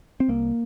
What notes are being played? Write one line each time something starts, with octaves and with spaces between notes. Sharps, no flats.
C4
C2 A#3